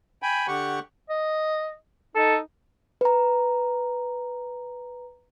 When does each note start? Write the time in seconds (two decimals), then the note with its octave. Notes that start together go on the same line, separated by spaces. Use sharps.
0.22 G5 G#5 B5
0.48 D3 G4 F#5 C#6
1.09 D#5
2.15 D#4 A4
3.01 B4 A#5